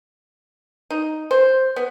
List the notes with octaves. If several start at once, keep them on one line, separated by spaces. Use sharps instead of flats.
D#4
C5
B3